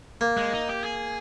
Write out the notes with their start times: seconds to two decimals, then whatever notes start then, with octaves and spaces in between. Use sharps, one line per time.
0.21 A#3
0.37 G#3
0.53 D#4
0.69 G4
0.84 G#4